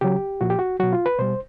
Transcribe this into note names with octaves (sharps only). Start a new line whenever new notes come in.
C#3 F#3 G4
A#2 F3 F#4
G4
F#4
B2 F#3 F#4
F4
B4
B2 G3 C5